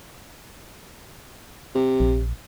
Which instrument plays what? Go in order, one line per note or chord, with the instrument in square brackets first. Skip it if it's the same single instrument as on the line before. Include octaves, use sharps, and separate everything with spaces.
[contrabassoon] C3
[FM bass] A#1